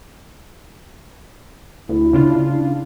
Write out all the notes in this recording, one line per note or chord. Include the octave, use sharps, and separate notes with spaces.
D2 E4
C#3 D4 F4